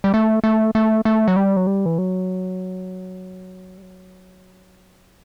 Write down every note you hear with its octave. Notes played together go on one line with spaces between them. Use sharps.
G3
A3
A3
A3
A3
F#3
G3
F#3
G3
E3
F#3
G3
F#3